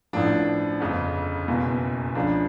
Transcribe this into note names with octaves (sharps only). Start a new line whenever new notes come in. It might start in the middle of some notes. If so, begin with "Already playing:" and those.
A1 A2 F3 D4
G1 F2 C#3
F#1 E2 B2
C#2 C#3 F3 D4